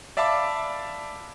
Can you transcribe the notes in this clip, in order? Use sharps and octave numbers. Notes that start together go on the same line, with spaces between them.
D5 E5 F5 A5 B5 D6